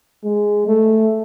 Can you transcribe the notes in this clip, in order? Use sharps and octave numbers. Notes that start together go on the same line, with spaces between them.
G#3
A3